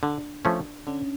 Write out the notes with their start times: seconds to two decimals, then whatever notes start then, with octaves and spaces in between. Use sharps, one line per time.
0.03 D3 D4
0.45 F3 A3 C#4
0.87 D3 C#4